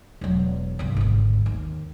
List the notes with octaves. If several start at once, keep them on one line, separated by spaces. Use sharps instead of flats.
E1 F#3
C2 G2
G#1 D2
D#2